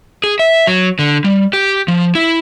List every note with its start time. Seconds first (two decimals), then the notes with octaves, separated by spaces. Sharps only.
0.24 G#4
0.39 E5
0.67 F#3
0.99 D3
1.24 G3
1.53 G4
1.88 F3
2.15 E4